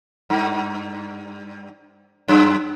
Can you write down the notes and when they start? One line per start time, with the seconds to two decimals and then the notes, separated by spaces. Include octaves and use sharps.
0.30 G2
2.28 F#2